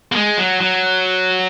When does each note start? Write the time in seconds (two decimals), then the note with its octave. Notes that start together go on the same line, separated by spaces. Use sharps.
0.12 A#3
0.16 G#3
0.38 F#3
0.61 F#3